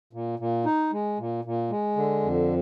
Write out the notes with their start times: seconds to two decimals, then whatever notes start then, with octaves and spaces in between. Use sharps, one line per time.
0.13 A#2
0.39 A#2
0.65 D#4
0.92 G#3
1.19 A#2
1.45 A#2
1.70 G#3
1.96 D3
2.23 F2